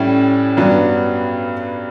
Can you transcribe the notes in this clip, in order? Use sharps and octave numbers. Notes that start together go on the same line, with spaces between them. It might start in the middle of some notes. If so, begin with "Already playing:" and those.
Already playing: A2 G3 C#4 E4
G2 F#3 B3 D4